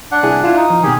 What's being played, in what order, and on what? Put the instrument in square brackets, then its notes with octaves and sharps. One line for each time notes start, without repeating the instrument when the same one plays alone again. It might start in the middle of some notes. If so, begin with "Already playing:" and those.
[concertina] D4 F#5
[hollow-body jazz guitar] C2 E4 G#4
E4 F4
[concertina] D#4
[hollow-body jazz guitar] F3
[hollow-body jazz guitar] B2 D#3 [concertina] G4 G#4